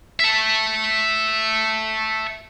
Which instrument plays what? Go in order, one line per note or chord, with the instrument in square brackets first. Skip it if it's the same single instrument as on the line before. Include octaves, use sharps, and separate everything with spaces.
[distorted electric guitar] E5 A5